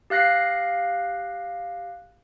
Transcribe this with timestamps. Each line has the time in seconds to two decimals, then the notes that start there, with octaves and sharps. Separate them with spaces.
0.10 G4 F5 F#6 A#6 C7